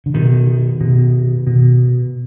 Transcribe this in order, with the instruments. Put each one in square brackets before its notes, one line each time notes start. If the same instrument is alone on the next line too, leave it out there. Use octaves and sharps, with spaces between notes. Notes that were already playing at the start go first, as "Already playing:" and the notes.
[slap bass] D3
B2 D#3
B2
B2